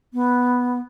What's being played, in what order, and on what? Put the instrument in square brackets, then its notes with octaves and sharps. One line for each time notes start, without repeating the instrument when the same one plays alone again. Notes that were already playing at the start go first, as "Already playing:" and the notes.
[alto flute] B3